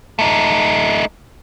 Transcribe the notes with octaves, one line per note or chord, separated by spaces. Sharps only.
A3 D#4